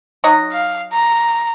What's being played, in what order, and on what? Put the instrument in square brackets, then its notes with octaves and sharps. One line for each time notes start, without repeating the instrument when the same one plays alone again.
[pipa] F#3 D#4 D#5
[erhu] F5
A#5